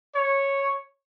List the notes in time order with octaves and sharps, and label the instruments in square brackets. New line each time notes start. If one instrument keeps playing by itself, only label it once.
[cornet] C#5